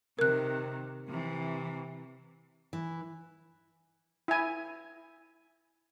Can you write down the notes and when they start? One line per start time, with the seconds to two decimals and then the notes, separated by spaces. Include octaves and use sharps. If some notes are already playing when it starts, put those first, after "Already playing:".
0.19 C3 D#3 A#4 F#6
1.08 C3 E3
2.73 E3
4.28 E4 G#5